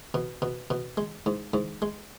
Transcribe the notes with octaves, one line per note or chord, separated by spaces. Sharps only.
B2
B2
B2
G#3
G#2
G#2
G#3